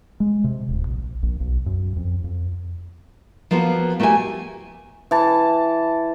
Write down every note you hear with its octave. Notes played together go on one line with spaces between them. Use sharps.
G#3
C3
D1
A#1
A#1
B1
F#2
F2
F2
F3 A#3 B3 F4 F#4
A3 A#3 F#4 G4 G#5
E3 A5